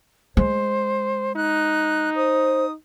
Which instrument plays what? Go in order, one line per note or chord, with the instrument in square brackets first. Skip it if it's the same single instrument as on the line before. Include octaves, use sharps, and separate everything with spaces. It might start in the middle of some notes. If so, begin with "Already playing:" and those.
[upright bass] G#3 [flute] C5
[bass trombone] D#4 [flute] F#6
[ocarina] C5 [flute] D#6